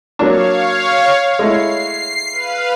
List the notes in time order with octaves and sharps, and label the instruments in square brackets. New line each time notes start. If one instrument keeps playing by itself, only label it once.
[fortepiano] F#3 A#3 D4 [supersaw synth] C#5 F5
[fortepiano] G#3 A3 E4 [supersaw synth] C7
[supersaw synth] B4 F5